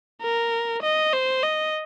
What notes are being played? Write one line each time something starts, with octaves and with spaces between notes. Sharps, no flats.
A#4
D#5
C5
D#5